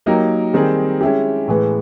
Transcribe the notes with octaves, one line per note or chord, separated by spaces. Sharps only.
F#3 A#3 D#4 G4 A#4
D#3 G3 C4 D#4 G#4
G#3 C#4 E4 G4
A2 E3 G#3 B3